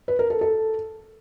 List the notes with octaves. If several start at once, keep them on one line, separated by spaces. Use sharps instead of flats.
B4
A#4
A4
A4